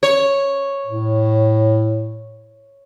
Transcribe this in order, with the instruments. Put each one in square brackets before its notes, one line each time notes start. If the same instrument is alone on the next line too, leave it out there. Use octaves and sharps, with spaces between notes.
[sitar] C#5
[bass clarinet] A2